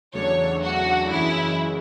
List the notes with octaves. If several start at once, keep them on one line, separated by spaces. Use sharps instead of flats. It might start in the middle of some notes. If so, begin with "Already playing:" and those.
E2 C#3 F#3 A3 D4 C#5
F#4
F#2 C#3 E3 G#3 E4